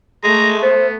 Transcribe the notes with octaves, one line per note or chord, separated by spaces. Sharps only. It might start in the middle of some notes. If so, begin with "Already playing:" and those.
G#3 A3 A#5
B3 C5